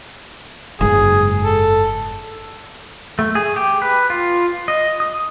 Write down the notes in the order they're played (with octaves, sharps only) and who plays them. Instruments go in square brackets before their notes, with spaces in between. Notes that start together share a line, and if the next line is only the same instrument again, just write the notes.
[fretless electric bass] F#1 G#2 [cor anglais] G#4
[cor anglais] A4
[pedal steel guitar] A3
G#4
G4
B4
F4
D#5
D#6